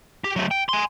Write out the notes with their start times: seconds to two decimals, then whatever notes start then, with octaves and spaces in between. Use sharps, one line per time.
0.24 G4
0.36 F#3 A3
0.51 G5
0.69 G#5 C6